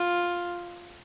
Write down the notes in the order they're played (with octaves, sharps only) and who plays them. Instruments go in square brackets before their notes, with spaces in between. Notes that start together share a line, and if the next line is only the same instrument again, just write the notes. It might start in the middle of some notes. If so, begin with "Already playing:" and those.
Already playing: [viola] F4